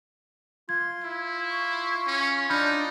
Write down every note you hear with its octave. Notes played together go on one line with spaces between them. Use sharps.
F4 C6 G#6
E4
C#6
C#4
D4 D#4 B5 F6 G6